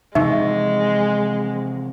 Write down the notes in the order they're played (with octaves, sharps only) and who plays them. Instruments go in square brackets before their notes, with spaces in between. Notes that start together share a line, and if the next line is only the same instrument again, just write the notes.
[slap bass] C3 E3 F3 [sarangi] G#3 [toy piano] D#4 [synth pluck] E5 C#6